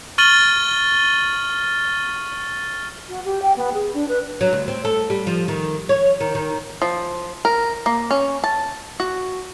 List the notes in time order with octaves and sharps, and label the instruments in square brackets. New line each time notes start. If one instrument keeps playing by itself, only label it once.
[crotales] C#6 F6 A6 D#7 F#7 G7
[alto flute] F#4
G4
G5
B3
G#4
D4
B4
[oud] F#3
D2
C4
A4
G3
F3
D#3
C#5
D#3
D#3
[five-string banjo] F3
A#4
A#3
C#4
A5
F#4